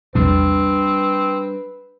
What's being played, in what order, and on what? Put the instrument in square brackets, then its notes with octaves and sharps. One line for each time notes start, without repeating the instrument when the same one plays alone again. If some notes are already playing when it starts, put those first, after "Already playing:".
[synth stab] A#1 E2 C3 [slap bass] G3 D4 [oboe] C4 [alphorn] B4